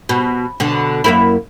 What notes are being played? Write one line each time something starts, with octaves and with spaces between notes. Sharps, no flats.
B2
B2 D3
F#2 A#3 E4